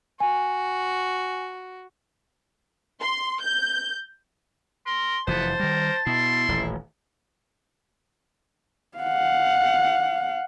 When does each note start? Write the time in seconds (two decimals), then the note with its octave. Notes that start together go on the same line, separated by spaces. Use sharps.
0.20 F#4 G#5
3.02 C6
3.42 G6
4.86 A#4 C6
5.27 F1 E3 B3 C5 A5
5.60 D#3 G3 A#4
6.07 B2 E4 C6
6.49 D#1 A1
8.98 F5 F#5